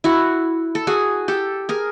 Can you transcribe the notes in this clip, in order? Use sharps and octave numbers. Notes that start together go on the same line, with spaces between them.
E4 F#4
A4
F#4 G#4
G4 A4
G#4 A#4